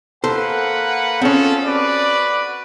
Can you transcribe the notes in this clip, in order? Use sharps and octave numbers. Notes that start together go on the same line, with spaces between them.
A#3 A4 B4 C5 F#5
C4 C#4 F4 G#4 A4
F#4 B4 D5